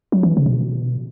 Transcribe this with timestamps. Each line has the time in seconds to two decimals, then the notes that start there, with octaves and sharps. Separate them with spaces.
0.12 F#3
0.23 E3
0.37 C#3
0.46 B2